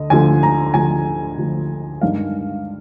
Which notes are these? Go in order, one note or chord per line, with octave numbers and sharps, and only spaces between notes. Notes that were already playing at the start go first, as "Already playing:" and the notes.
Already playing: D2 D3 D#5
D2 D3 F3 G#5
A#5
D2 D3 F3 G#5
D2 D3 F3
G2 D#3 G#3 D4 F5